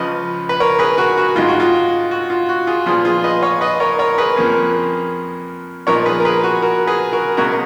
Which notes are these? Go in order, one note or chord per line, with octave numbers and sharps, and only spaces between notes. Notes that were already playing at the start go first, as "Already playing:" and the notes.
Already playing: C#2 C#3 F3 B4 D#5
B4
A#4 C#5
G#4 B4
F#4 A#4
F#4
G#2 D#3 G#3 F4
F#4
F4
F#4
F4
F#4
F4 G#4
A#2 F3 B3 F4 G#4
F4 G#4
B4 D#5
C#5 F5
B4 D#5
A#4 C#5
A#4 C#5
G#4 B4
F2 F3 A#3 C#4
A#2 F3 B3 D#4 A#4 C#5
G#4 B4
A#4
G#4 B4
F#4
F#4 A#4
G#4 B4
F#4 A#4
C#2 B2 G#3 C#4 F#4 A#4